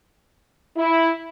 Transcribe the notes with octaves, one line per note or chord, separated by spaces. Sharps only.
E4